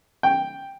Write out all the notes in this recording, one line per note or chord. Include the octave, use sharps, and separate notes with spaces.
G5